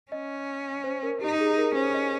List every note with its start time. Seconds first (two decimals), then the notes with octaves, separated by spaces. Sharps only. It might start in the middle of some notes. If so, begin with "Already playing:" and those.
0.12 C#4 D#5
0.84 C5
1.03 A#4
1.21 D#4 G4
1.40 G#4
1.58 A#4
1.75 C#4 C5
1.94 D#5